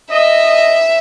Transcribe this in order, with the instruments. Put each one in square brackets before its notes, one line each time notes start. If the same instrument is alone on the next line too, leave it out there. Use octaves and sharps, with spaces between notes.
[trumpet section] D#5 [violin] E5